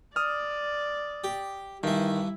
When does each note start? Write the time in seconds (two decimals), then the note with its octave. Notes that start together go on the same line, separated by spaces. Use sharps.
0.16 D5 D#6 F6
1.24 G4
1.83 G2 D#3 E3 E4